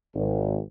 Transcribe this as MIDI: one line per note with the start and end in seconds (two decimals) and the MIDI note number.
0.15 0.59 32